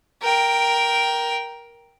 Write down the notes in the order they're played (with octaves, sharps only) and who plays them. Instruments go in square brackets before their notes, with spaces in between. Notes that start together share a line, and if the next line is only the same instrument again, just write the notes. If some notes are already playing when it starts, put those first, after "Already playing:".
[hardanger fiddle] A#4 G5